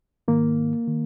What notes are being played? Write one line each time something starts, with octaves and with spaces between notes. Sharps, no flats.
G#2 D#3 A#3
D#3